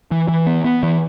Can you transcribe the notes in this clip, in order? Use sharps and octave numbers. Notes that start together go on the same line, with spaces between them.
E3
E3
B3
B3
E3